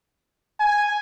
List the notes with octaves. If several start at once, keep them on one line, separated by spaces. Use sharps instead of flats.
G#5